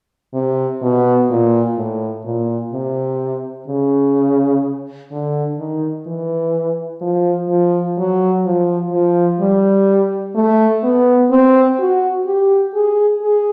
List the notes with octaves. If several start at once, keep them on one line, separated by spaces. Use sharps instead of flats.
C3
B2
A#2
A2
A#2
C3
C#3
D3
D#3
E3
F3
F3
F#3
F3
F3
G3
A3
B3
C4
F#4
G4
G#4
G#4